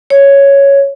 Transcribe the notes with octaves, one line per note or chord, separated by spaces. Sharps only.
C#5